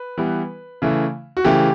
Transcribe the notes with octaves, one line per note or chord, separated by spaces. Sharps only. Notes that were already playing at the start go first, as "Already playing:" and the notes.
Already playing: B4
E3 G3 B3
C#3 E3 A3
F#4
C#3 E3 A3 G4